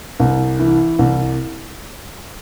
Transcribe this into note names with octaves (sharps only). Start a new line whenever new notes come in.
C2
E3
C2